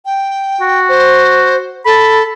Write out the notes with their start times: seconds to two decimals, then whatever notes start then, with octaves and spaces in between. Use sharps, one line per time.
0.05 G5
0.61 F#4
0.89 C5
1.86 A4 B5